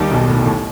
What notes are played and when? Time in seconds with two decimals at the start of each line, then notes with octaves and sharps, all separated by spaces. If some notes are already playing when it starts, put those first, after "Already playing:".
Already playing: D#2 D#3 G3 D#4 G4
0.11 B1 B2
0.29 A2
0.42 B2
0.46 A2